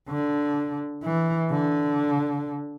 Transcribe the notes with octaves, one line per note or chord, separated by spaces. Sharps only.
D3
E3
D3